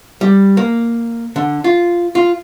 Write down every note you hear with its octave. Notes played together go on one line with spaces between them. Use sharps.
G3
A#3
D3
F4
F4